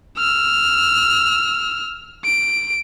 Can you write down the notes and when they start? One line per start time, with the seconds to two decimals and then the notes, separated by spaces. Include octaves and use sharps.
0.17 E6 F6
2.25 D7